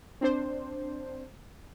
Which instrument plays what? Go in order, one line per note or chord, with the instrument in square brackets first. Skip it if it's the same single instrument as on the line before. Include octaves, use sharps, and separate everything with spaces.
[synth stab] C4 D4 C5